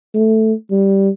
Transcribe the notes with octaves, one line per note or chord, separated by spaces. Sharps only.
A3
G3